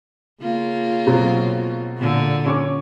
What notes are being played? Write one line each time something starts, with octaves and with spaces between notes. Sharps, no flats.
C#3 A#3 F4
B2 F#3 C4
A#2 D3
C#4 C#6 D6